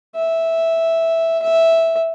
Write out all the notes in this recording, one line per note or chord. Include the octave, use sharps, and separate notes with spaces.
E5
E5